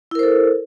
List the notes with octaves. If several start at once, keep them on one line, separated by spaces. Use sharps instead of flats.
E4 A4 A#4 C5